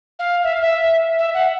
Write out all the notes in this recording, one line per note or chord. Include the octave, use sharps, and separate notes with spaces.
F5
E5
F5
E5
E5
F#5